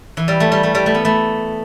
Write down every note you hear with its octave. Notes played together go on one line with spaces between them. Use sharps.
E3
G3
A3
G3
A3
G3
A3
B3
A3